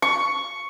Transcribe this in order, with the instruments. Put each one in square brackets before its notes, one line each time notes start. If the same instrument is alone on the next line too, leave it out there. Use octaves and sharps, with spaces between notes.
[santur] C#6